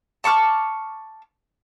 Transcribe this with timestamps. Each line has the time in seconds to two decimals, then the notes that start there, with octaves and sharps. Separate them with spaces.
0.24 A5 C#6 D6 F6